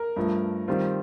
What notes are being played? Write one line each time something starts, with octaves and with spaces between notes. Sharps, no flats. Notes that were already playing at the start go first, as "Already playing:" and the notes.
Already playing: A#4
G2 F3 A3
D#3 G3 C4 F4